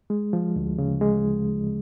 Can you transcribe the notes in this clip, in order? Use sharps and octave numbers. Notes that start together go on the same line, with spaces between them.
G#3
F3
D2
C#3
G#3